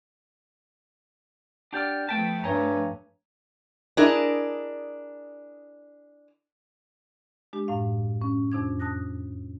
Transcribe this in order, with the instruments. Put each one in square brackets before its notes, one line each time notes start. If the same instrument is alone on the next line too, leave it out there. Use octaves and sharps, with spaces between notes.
[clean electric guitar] D4 G4 D5 [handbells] F#5 F6
[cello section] F3 A3 B3 [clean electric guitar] G5 A5 [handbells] B6
[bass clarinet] G2 [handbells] C#5 G#5 A#5
[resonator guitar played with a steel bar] D4 E4 G#4 A#4 D#5
[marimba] G#3 D4 G4
F#2 A2 F5
C#4
F2 C3 D4 G#6
A5 D#6 F#6 A#6